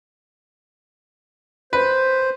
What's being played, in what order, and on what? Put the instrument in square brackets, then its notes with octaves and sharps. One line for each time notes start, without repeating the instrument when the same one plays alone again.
[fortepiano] B4 [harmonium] C5